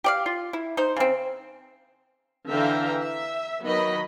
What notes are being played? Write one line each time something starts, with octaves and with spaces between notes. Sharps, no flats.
G4 D5 F5
F4
E4
D#4 C5
C#3 C4
D3 E3 E5 F5 G5 A#5
E5
D#3 F#3 B3 D#5 B5